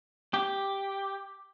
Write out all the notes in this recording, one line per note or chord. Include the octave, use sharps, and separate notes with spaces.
G4